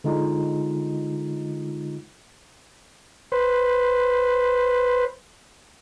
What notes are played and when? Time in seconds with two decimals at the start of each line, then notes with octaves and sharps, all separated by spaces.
0.04 D3 G#3 D#4 F4
3.32 B4 C5